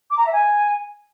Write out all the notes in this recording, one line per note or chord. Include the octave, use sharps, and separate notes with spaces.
D6
A#5
E5
G#5